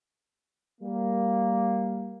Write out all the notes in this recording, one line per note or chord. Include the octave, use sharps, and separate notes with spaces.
G3 A#3